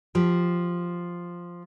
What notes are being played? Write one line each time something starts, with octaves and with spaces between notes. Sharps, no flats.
F3 G4